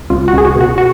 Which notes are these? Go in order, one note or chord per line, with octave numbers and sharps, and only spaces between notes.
C#2 F4
F#4
C#2 G#4
F#4
B2
F#4
F#4